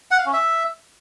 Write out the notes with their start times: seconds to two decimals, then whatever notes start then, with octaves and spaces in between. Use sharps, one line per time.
0.11 F#5
0.18 F5
0.26 C#4
0.33 E5